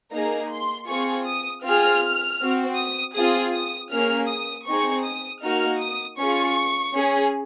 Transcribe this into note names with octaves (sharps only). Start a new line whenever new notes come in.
A#3 D#4 G#4 A#5
C6
C4 F4 G#4 C#6
D#6
C4 F4 G#4 F6
C4 F#4
D#6
C4 F4 G#4 D#6
D#6
A#3 C#4 G#4 F6
D#6
C4 D#4 G#4 C#6
D#6
A#3 D#4 F#4 F6
D#6
C#4 F4 G#4 C#6
C#4 G#4